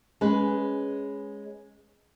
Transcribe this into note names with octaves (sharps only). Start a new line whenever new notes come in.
G#3 C#4 G#4 B4